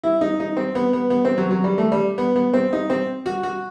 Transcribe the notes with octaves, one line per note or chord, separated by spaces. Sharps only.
E4
D#4
D#4
C4
B3
B3
B3
C4
F#3
F#3
G3
A3
G3
B3
B3
C4
D#4
C4
F#4
F#4